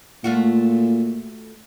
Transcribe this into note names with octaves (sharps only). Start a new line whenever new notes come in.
A#2 A3 F4 F#4